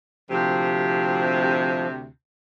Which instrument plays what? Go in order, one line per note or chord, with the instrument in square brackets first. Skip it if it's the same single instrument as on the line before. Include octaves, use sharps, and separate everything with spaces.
[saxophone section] D2 C3 [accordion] F3